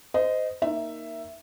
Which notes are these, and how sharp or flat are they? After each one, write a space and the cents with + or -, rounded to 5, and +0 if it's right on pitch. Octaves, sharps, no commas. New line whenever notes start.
C5 -25 D#5 +0
A#3 +0 D#4 +0 E5 +10